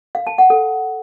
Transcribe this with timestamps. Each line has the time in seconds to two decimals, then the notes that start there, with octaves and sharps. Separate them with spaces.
0.15 F5
0.27 A5
0.38 F#5
0.50 A4